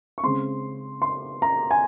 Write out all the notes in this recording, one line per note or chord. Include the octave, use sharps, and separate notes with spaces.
C#6
C#3 G#3 C4 C6
C6
A#5
G#5